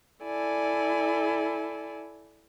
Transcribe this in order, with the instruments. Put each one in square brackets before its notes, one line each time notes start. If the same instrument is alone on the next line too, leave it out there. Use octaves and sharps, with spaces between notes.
[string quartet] E4 A4 D5 G#5